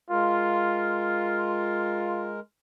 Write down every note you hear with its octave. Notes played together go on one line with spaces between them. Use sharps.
G#3 F4 A#4